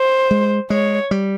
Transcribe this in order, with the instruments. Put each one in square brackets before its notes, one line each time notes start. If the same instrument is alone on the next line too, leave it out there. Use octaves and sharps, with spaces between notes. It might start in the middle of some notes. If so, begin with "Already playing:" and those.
Already playing: [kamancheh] C5
[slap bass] G#3
[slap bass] G#3 [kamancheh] C#5
[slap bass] G3